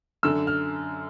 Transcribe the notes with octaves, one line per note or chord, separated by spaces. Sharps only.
F#2 D3 E6
F6